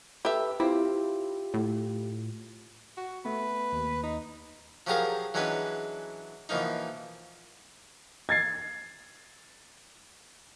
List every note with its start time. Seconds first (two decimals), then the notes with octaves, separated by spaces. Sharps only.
0.25 G4 A4 B4 E5 B5
0.60 C4 E4 F4 G4
1.54 A2
2.98 F#4
3.25 A3 B3 B4
3.72 D#2
4.04 D#4
4.87 F3 F#3 G4 G#4 A#4 F5
5.34 E3 F#3 G#3 C#4 D4 B4
6.49 B2 E3 F3 A#3 D#4
8.29 G#6 A6 C7